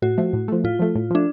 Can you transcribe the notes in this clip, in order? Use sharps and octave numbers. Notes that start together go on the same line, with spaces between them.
A2 F#4
F3 A3
A2
F3 A3
A2 F4
F3 A3
A2
F3 A3 D4